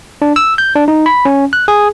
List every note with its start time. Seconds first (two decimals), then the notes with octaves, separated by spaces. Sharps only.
0.22 D4
0.36 E6
0.58 G6
0.75 D4
0.88 D#4
1.06 B5
1.25 C#4
1.53 F#6
1.68 G#4